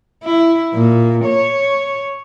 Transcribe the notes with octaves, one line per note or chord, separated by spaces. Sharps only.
E4
A#2
C#5